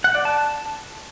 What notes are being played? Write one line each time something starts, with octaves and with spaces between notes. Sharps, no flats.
F#5
D5
A5